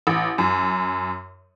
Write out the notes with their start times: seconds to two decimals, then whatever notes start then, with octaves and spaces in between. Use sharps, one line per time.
0.07 A1
0.38 F#2